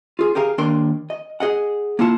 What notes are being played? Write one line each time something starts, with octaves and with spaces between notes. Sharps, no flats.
F4 G#4
G4 G#4 A#4 F5
D#2 D4 A#4 C6
D#5
G#4 D#5 F#5
A#3 E4 F4 F#5 A5